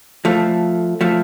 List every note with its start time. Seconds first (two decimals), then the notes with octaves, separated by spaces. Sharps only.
0.25 F3 A3
1.01 F3 A3